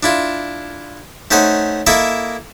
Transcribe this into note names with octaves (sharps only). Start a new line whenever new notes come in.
D4 E4 F4
A3 C#4 D#4 C5 D#5 F#5
A#3 E4 A4 D#5 E5 C#6